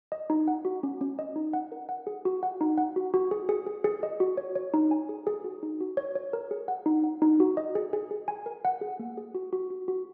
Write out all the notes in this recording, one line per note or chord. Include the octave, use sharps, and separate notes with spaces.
D#5
D#4
F#5
F#4
C#4
C#4
D#5
D#4
F#5
A#4
F#5
G#4
F#4
F#5
D#4
F#5
F#4
F#4
G#4
G#4
G#4
G#4
D#5
F#4
C#5
C#5
D#4
G#5
G#4
G#4
F#4
D#4
F#4
C#5
C#5
A#4
G#4
F#5
D#4
F#5
D#4
F#4
D#5
G#4
G#4
G#4
G#5
A#4
F#5
G#4
A#3
G#4
F#4
F#4
F#4
F#4